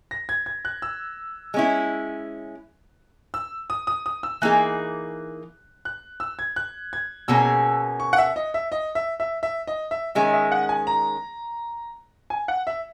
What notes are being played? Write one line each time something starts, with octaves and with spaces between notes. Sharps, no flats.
A#6
G#6
G#6
F#6
E6
G#3 C#4 E4
E6
D#6
D#6
D#6
E6
E3 A#3 D#4 G#4 F#6
F#6
E6
G#6
F#6
G#6
B2 A#3 C#4 G#4 E6
C#6
F#5
E5
D#5
E5
D#5
E5
E5
E5
D#5
E5
D#3 G#3 C#4 E5
E5
F#5
G#5
A#5
G#5
F#5
E5